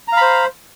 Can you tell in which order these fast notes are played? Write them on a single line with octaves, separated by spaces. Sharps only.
A#5 F5 B5 C5